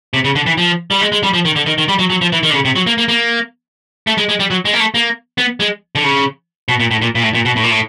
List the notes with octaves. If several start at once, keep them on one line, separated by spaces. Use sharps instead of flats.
C3
C#3
D3
E3
F3
G3
G#3
G#3
G3
F3
D#3
D3
D#3
D#3
G3
F#3
F#3
F3
E3
D#3
D3
C#3
C3
F#3
A#3
A#3
A#3
A3
G#3
G#3
G3
F#3
G#3
A#3
A3
A#3
B3
G#3
D3
C#3
B2
A#2
A2
A#2
A#2
A2
A#2
B2
A2
A#2
A2